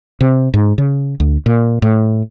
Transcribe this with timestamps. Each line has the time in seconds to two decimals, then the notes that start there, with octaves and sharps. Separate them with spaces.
0.21 C3
0.54 G#2
0.78 C#3
1.20 D2
1.46 A#2
1.82 A2